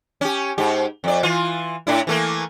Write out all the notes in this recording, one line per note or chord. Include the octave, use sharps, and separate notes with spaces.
C#4 G4
G#2 G4
F2 D5
E3 F4
A2 D4 E4
E3 A3 A#3